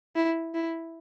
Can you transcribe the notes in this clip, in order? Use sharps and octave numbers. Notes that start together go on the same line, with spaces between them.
E4
E4